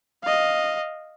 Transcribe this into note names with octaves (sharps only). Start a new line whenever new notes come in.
D#5 F5